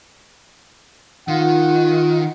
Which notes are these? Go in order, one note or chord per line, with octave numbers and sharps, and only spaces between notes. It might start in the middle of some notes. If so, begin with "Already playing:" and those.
D#3 F4 F#5